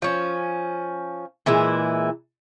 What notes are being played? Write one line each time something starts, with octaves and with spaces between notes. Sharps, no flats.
F3 C#4
A#2 E3 G#3 E4